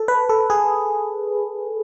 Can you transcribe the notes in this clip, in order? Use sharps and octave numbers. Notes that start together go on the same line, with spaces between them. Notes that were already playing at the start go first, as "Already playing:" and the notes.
Already playing: A4
B4
A4
G#4